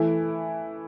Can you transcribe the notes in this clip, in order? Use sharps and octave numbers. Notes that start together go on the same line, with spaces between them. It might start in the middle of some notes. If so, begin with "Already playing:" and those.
Already playing: E3 A3 E4